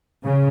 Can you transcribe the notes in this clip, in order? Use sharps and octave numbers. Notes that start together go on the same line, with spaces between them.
C#3